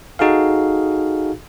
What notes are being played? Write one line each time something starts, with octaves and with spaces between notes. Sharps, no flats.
D#4 F#4 G#4 A4 F5